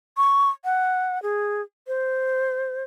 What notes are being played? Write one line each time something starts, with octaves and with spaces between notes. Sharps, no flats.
C#6
F#5
G#4
C5